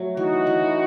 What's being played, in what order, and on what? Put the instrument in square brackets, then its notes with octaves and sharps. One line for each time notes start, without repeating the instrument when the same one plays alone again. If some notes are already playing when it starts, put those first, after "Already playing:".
Already playing: [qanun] F#3 A3
[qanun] E3 [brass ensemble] D#4 F#4
[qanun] E3